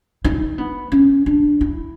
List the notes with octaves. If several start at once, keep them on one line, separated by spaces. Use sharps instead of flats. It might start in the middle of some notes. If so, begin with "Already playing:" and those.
D#4
B3
C#4
D4
E4